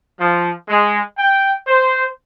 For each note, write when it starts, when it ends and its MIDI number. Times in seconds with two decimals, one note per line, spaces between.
0.20 0.51 53
0.68 0.98 56
1.18 1.54 79
1.67 2.05 72